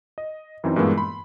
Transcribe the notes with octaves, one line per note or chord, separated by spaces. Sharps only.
D#5
F#2 E3 C4 D#4
G2 A#2 E3 G#3 A#3 B3
B5 C6